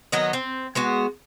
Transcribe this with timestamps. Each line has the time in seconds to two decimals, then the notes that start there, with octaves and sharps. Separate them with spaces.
0.12 D#3 F#3 B3 D#5
0.33 C4
0.75 G#3 B3 F#4